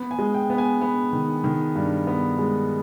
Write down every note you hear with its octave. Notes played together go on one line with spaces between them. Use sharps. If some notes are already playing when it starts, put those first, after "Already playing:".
Already playing: B3
G#5
G#3
G5
B3
G#5
B3
D#3
D#3
G2
B3
G#3